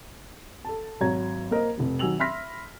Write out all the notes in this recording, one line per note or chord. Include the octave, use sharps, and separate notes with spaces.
A4 A5
G#1 F#3 C#5 A#5 G#6
A#3 A#4 C5 D#5
F1 F2
D#3 F#3 G#5 E6 F7 F#7
E5 B5 C6 F6 A#6 B6